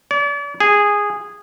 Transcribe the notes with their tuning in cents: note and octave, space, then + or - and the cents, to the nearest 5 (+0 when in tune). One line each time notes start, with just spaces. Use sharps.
D5 -40
G#4 -10